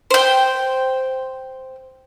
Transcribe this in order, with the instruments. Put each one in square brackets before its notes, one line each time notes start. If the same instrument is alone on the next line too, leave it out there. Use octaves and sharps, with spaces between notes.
[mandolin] C5 G5